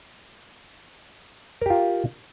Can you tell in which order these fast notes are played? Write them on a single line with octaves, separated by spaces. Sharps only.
A#4 G4 F4